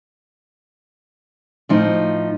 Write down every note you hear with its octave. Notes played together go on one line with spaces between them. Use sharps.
A2 F3 D#4